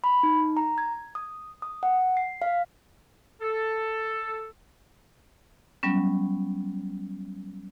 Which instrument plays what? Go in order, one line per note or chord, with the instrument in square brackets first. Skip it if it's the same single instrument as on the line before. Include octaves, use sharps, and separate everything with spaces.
[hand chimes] B5
D#4
A#5
G#6
D#6
D#6
F#5
C7
F5
[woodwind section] A4
[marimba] F#3 G3 B3 C#4